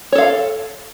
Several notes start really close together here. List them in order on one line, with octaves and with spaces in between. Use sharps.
C#5 A4 F5